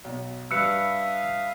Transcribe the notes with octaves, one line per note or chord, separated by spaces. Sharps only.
B1
G2 B4 E5 F5 D#6 E6 F#6 C#7